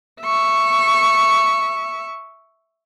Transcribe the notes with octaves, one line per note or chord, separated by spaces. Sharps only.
E5 C#6